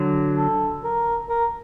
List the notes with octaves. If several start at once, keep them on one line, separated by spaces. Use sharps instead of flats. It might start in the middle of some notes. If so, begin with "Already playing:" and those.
Already playing: D3 F#3
A4
A#4
A#4